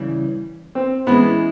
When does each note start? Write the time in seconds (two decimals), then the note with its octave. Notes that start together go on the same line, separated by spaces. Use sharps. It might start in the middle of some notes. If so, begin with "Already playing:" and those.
Already playing: C#3 E3 G3
0.75 C4
1.07 E3 G#3 B3 C#4 E4